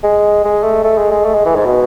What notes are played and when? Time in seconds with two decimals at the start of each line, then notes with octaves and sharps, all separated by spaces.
0.03 G#3
0.44 G#3
0.63 A3
0.84 A3
0.98 G#3
1.11 G#3
1.25 A3
1.34 G#3
1.45 E3
1.55 G#2
1.65 B2